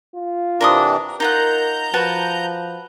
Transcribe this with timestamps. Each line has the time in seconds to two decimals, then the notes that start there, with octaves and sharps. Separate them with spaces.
0.15 F4
0.61 C3 E3 D4 A#4 C6 D#6
1.20 D#4 F4 A#4 F#5 A#5 G6
1.94 F3 F#4 B4 A5